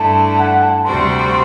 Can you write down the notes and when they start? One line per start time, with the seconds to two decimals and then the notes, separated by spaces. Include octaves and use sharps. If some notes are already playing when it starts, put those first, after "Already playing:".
Already playing: G2 D3 A3 E4 A5
0.39 F#5
0.62 A5
0.85 D2 C3 G3 C4 F#4 C6